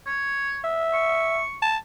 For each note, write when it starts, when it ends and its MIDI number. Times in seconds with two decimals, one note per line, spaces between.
0.06 0.59 73
0.64 1.41 76
0.93 1.56 85
1.62 1.77 81